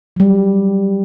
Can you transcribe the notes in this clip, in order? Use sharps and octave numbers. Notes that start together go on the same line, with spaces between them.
F#3 G3